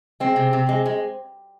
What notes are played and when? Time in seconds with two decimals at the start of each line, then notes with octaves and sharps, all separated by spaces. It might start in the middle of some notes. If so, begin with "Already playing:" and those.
0.20 G#3 C4
0.36 C3
0.53 C3
0.69 G#3
0.86 G#3